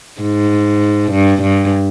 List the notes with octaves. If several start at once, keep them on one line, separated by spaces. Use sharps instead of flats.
G#2
G2
G2